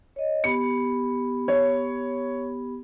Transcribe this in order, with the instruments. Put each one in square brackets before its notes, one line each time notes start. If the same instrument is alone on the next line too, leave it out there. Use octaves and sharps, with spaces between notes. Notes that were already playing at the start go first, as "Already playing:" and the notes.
[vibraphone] C#5 D#5
[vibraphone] B3 G4 B5 [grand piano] C#7
[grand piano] C#5